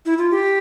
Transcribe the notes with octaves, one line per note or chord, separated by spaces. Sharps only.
E4
F4
G4